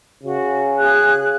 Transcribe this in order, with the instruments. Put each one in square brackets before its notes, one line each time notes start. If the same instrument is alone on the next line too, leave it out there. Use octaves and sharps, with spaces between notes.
[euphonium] C#3 [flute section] F#4
[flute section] G#4 F#6